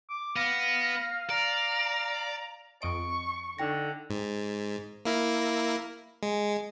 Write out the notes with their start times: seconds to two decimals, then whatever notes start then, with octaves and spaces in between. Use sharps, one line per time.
0.10 D6
0.36 B3 F5 A#6
1.30 D5 A#5
2.82 F2 D#5 C#6 D7
3.59 D3 D#4 G5 A#6
4.10 G#2
5.05 A#3 E4 A#4
6.23 G#3